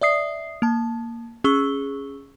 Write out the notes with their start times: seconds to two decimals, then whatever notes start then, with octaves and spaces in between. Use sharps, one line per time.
0.01 D5 E5 D#6 C7
0.62 A#3 A5
1.44 C#4 G#4 C#6 E6 G7